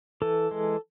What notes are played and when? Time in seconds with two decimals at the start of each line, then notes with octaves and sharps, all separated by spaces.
0.22 E3 A4
0.51 G#3